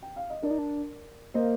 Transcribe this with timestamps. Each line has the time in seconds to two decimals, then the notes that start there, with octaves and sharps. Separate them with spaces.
0.03 G5
0.16 F5
0.30 D#5
0.42 D4 A#4 D5
0.51 D#4
0.59 D4
1.34 A#3 C5 D#5